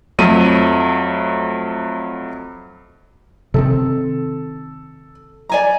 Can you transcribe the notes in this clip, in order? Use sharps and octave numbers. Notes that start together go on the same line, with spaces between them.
F2 F#3 A3 D#7
C3 D#3 C4 A4
D5 G#5 A#5